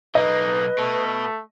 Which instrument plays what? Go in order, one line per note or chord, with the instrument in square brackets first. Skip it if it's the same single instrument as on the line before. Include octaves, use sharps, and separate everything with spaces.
[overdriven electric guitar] B1 A#3 [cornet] D#4 [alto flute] B4 [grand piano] D#5
[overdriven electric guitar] B2 [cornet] A3